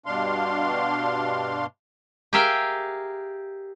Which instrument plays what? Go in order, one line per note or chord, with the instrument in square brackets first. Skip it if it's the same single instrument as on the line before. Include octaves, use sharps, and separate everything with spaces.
[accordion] G2 B2 D4 F5 C6
[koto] G4 G#4 A#4 E5 F5 G5